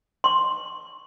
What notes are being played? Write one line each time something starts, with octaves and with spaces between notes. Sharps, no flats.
C6 C#6